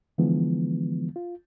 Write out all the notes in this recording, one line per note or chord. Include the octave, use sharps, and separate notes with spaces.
D3 E3 F3 G#3 B3
F4